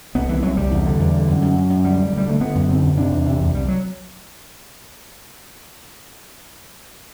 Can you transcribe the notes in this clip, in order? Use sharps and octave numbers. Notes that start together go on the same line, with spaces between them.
C2 B3
C2 E3
C2 F#3
C2 G3
E2
D3
E2
D3
F#2
F#2
F#2
F#2
D2 G3
D2
D2 G3
D3 A3
D3 B3
F#2
D3 C4
F#2
C3 D4
E2
C3
E2
C2 G3
F#3